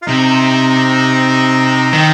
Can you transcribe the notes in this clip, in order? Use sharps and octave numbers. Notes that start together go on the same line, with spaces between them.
F4
C3 C4 D#4
D#3